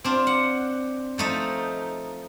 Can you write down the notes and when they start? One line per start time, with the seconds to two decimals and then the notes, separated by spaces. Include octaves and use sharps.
0.04 C4 D4 F4
0.27 F#5
1.18 F3 A3 D#4